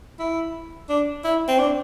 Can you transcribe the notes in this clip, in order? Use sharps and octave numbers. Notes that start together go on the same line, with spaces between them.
E4
D4
E4
C4
D4